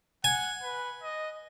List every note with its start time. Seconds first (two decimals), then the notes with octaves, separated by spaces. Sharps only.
0.24 F#5 G#5
0.63 B4
1.03 D#5